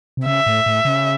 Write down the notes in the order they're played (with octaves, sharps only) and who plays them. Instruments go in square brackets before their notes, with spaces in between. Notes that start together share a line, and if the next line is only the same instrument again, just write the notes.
[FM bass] C3
[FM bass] C#3 [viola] E5
[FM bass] A2
A2
C#3